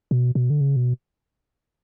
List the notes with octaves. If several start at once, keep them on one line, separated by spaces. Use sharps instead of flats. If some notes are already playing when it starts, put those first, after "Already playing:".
B2
B2
D3
C#3
B2